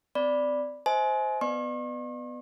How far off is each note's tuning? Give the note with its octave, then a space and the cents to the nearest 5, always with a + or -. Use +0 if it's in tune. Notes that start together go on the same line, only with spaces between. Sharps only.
C4 -35 D5 +0 B5 +0
C5 -5 D#5 +45 G#5 +30
B3 +10 D5 +40 C#6 -45